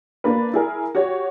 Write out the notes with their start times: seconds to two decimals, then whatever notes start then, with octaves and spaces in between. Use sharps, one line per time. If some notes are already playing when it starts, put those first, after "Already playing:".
0.24 A#3 D4 B4
0.54 E4 G#4 A#4
0.95 F#4 G4 C#5